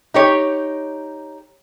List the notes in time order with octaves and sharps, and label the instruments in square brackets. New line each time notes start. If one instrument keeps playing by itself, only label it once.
[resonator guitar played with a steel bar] D#4 G4 C#5